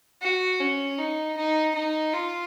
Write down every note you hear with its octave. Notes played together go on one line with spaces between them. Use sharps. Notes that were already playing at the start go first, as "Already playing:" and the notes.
F#4
C#4
D#4
D#4
D#4
F4